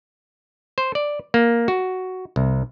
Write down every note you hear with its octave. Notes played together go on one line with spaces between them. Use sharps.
C5
D5
A#3
F#4
C2